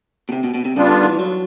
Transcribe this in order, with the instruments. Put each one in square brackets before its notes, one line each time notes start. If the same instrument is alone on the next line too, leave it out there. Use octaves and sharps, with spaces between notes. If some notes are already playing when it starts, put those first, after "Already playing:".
[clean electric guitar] B2
C3
B2
B2
C3
[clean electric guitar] C#3 [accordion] G3 B3 D4 F4
[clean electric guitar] D3
D#3
E3
F#3